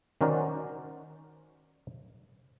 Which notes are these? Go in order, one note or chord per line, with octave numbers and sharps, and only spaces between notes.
D#3 C#4 F#4 A#4 C5 D5